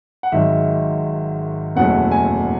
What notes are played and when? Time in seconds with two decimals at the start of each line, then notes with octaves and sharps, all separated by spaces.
0.23 F#5
0.32 G#1 G#2 D#3 F#3 E5
1.75 F#1 E2 B2 F#3 A3 F#5
2.12 G#5